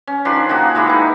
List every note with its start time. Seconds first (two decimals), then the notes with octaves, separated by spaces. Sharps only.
0.07 C#4
0.25 D#3 F3 D4 C6
0.49 D#3 A#3 F#4 G#4
0.75 D#3 G#3 E4 G4
0.87 B3 D#4